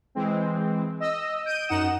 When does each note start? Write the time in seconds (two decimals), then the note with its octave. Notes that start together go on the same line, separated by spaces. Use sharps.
0.15 E3 G#3 C4
1.00 D#5 E6
1.46 G6 D7 D#7
1.68 F#2 D#4 F#5 D#6 E7